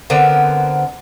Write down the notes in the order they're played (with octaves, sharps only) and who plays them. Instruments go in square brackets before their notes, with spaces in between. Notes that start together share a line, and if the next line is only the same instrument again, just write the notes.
[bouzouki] D3 B3 C4 A#4